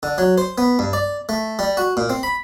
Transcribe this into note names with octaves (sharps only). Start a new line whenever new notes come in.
D3
F#3
C5
B3
G2
D5
A3
G3
F#4
A#2
C4
B5